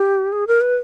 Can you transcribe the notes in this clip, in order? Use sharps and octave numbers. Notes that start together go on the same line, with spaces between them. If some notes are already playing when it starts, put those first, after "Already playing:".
Already playing: G4
G#4
A#4
B4